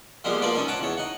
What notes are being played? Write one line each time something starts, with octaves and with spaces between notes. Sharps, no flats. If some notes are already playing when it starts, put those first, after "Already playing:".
F3 G3 G#3 A#3 B3
F3 A#3 F4 B4 D5
C#4 D#4 A4
C#5 F#5 A5 D6
E2 C#5
D#4 F#5